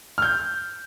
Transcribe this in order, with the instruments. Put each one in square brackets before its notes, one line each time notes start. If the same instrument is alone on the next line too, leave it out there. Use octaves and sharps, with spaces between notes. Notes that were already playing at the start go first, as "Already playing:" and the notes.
[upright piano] F6 G6